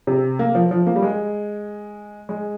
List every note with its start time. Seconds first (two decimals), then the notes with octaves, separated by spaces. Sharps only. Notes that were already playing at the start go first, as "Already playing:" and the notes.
0.07 C3
0.39 A#3
0.55 F3
0.71 F3
0.87 A#3
0.96 G3
1.02 G#3
2.29 G#3